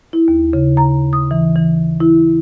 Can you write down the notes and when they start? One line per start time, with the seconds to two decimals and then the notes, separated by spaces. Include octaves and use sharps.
0.13 E4
0.28 D#2
0.53 C#3
0.77 A#5
1.13 D#6
1.31 E3
1.56 E3
2.00 E4